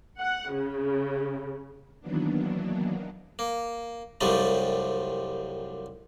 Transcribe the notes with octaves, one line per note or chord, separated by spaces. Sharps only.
F#5
C#3
D#3 E3 F#3 A#3 B3 D4
A#3
C2 F#2 C3 F3 G3 A3